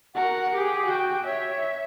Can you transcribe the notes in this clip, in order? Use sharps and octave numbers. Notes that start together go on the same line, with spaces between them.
F#4 A#4 F#5
G4 G#4
F#4 G5
C#5 E5